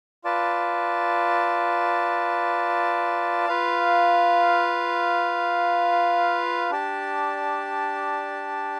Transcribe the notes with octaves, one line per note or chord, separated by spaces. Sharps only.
F4 B4 D5 A5
F4 B4 F5
D4 G4 D5 A5